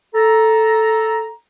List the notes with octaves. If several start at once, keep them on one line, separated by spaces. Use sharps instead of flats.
A4 A#5